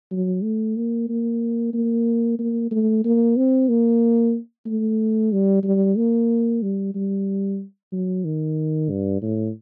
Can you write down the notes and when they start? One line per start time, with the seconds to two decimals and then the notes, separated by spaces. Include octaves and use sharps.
0.11 F#3
0.43 A3
0.76 A#3
1.09 A#3
1.73 A#3
2.38 A#3
2.71 A3
3.04 A#3
3.36 C4
3.68 A#3
4.66 A3
5.32 G3
5.63 G3
5.97 A#3
6.62 G3
6.95 G3
7.92 F#3
8.25 D#3
8.90 G2
9.22 A2